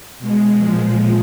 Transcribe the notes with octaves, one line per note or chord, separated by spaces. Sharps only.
B2 G#3
A#2 F3 G#3